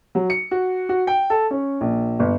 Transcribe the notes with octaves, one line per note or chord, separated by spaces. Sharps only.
F#3
C#7
F#4
F#4
G5
A4
C#4
A#1
G1